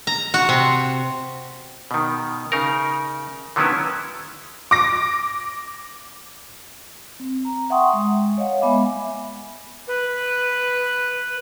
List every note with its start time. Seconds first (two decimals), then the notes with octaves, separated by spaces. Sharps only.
0.07 A#5
0.34 F#4
0.49 C3
1.91 B2 D#3
2.52 C#3 D#4 A#4
3.56 D3 D#3 F#3 B3 C#4 E4
4.71 D6 A#6
7.20 C4
7.45 A#5
7.70 E5 F#5 G5 C6 C#6 D#6
7.93 G#3
8.38 C#5 D#5 F5 F#5
8.62 G#3 B3 E5 G#5 B5 D6
9.87 B4